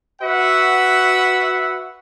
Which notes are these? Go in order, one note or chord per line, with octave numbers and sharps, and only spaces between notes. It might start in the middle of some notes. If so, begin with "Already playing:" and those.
F#4 B4 E5 F#5